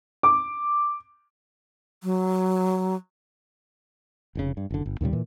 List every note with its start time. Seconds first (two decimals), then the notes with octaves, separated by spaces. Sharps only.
0.23 D6
2.04 F#3
4.35 F1 G#2 C#3
4.57 G2
4.70 F#1 D3
4.86 G1
5.01 D#2 A#2 C#3 G3
5.13 A#2 E3